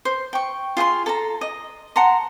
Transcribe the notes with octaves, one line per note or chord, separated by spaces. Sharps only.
C5
G5 C#6
F4 G#4 F#5 C6
A4 A5 A#5
D#5
F#5 A5 A#5 C6